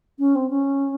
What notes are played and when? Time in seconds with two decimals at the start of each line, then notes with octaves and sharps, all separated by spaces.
0.19 C#4
0.35 C4
0.50 C#4